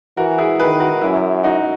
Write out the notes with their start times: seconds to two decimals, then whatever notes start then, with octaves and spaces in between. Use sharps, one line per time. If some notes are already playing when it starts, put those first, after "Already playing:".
0.17 E3 F#4 A#4
0.38 E4 G#4
0.60 D#3 G#4 B4
0.80 F#4 A#4
1.01 F#2 E4
1.43 D#4 F#4